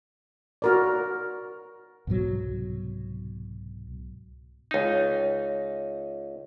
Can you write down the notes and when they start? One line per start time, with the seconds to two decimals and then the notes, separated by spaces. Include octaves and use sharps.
0.62 F#4 A#4 D5
2.07 C2 G#2 B2 F#3
4.71 C#2 D#4